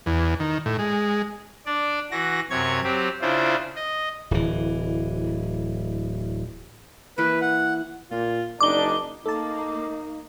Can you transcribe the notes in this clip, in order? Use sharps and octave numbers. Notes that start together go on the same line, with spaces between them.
E2
D#3
A2
G#3
D4 D5
E3 F#4 A#6
F#2 C3 C#5 G#6
F#3 C4 G4
C#3 D4 E4 F4 C5
D#5
D1 E3
E3 A#3 E4 B4
F#5
A#2 F4
F#1 D4 D#4 D6 G7
A#3 D#4 A4 A5 D6